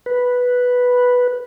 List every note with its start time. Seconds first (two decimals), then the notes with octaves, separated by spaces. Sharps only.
0.06 B4